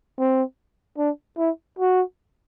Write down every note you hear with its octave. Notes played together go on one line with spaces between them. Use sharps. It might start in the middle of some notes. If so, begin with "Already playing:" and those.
C4
D4
E4
F#4